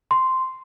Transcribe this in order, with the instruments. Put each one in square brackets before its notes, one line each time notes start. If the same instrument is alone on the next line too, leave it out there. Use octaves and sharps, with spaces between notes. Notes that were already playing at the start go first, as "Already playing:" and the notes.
[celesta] C6